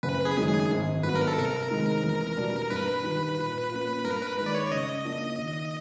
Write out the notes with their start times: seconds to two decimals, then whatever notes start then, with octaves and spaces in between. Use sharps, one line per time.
0.03 F#1 B4
0.25 G#4
0.37 F#2 D#3 G#3
0.48 G#4
0.70 G#1
1.03 G2 D#3 F#3 B3 B4
1.16 A#4
1.27 A4
1.36 C3 A#4
1.70 D#3 G#3
2.04 E2
2.37 B2 G3 B3 D4
2.70 G2 B4
3.04 D#3 G3
3.37 A#2
3.71 F3 A#3 C#4
4.04 G2 A#4
4.21 B4
4.37 D#3 G#3 B4
4.46 D5
4.54 C#5
4.66 D5
4.71 C#3 D#5
5.04 F3 A#3 D4 F4
5.38 D#2